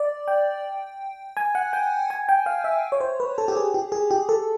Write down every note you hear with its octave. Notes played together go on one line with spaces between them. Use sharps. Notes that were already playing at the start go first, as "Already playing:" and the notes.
Already playing: D5
G5
G#5
F#5
G5
G#5
G5
F5
E5
C#5
C5
B4
A4
G4
G#4
G4
G#4
G4
A4